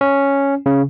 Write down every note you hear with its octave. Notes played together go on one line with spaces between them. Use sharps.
C#4
C#3